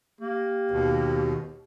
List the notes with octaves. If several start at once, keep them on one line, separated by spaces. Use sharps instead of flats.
A#3 G4
D#2 B2